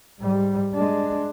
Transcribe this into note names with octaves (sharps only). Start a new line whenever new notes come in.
G#2 G3
G#3 D4